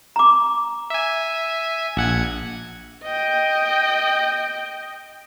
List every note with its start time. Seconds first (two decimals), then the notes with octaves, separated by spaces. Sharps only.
0.16 A#5 D6
0.90 E5 G#5
1.97 A#1 F#5 G#6
3.04 D#5 G5